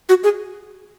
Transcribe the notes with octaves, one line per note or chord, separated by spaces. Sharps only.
F#4
G#4